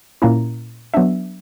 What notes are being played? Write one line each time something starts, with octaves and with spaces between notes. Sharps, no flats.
A#2 A#3 C#4 E4 A#5
F#3 B3 D4 E5